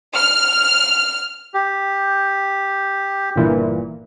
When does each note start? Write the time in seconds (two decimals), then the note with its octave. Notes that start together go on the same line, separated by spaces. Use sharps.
0.14 F6
1.54 G4
3.36 G1 A#2 E3